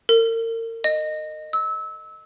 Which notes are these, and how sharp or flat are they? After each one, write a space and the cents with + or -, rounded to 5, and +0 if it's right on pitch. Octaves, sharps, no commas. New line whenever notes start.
A#4 -35
D#5 -15
E6 -25